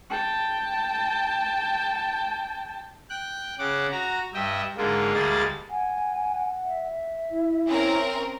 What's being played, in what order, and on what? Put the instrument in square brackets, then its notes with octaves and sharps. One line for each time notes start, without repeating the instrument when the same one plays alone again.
[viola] G5 A5
[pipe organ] G5 F#6
C#3 F#5 D6
F#4 A#5
G2 D#5 E5 G5
G#2 D3 G#3 A#3 F4
D2 G3 G#3 A#3 G#4 A6
[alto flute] F#5 [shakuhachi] G#5
[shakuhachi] E5
[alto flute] E4
[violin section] C4 C#4 A#4